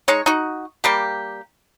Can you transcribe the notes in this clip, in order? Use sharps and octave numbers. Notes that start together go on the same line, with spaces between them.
G#3 D#4 C#5
D#4 F#4
G3 A#3 G4